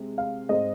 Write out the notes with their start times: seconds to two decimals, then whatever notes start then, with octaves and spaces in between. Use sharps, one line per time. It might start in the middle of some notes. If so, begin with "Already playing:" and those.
Already playing: C3 G#3
0.18 F5
0.49 G#2 G#3 C4 D#5